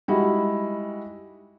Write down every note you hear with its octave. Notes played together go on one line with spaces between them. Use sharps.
G3 G#3 D#4 E4 F#4